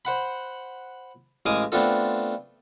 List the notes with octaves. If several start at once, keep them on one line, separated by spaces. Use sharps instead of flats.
C5 F#5 B5
A1 G#3 F5 G#5 D6 D#6
A3 B3 C4 D4 F4 A4